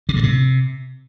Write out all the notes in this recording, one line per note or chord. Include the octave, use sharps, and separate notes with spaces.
C3
G2
C3